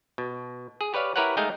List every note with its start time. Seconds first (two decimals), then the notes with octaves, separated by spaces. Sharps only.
0.18 B2
0.81 G#4
0.94 G4 B4 C#5 D5 F5
1.16 E4 G4 A#4 B4 C#5 F#5
1.37 G#3 A3 D#4 G#4 F5 G5